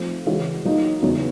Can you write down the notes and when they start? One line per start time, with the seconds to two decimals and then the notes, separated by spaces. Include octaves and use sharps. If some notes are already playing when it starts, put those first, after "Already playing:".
Already playing: F3 A3 C4
0.26 C#3 E3 G#3 C#4 F#4
0.65 F#3 A#3 D#4
1.02 E2 C#3 F#3